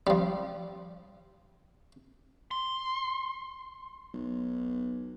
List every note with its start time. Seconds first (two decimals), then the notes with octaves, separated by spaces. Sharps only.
0.07 F3 G3
2.51 C6
4.14 B1